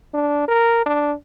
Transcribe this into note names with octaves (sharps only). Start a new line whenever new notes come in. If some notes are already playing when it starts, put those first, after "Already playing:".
D4
A#4
D4